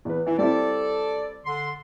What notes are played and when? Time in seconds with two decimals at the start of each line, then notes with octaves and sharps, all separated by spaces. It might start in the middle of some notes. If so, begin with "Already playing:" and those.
0.05 E2 B4
0.26 E3 E4
0.38 G3 C4 E4 A4 D5
1.46 D3 C6